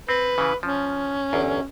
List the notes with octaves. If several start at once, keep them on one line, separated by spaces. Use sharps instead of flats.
C4 B4
C#3 E3
F3 C#4
G1 E2